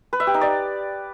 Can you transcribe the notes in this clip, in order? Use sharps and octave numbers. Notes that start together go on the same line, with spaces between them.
B4
E5
G4
D#4
D5